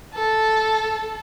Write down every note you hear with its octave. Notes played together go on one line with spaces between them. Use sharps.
A4